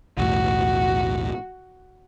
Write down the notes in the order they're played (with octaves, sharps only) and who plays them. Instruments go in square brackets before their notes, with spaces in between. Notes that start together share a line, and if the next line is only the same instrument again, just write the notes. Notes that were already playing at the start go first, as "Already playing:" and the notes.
[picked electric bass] B1 E2 A2 [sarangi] F#4